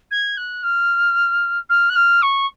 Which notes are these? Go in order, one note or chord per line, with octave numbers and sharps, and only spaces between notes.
G#6
F#6
F6
F6
F#6
F6
C#6